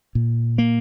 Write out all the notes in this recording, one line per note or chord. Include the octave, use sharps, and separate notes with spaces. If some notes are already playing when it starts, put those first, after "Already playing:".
A#2
A#3